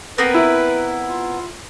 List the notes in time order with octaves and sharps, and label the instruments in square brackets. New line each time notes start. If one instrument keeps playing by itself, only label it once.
[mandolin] B3 C4 A#4 [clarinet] B4
[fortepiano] E4
[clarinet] F4